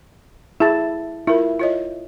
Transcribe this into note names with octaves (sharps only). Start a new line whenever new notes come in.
E4 G#4 A5
E4 F4 A#4
F4 C#5 D#5